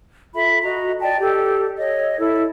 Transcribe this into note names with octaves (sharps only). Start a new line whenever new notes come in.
F4 A4 E5 B5
F#4 D#5 A#5
D5 D#5 G5 A5
G4 A4
C#5 D#5
E4 A4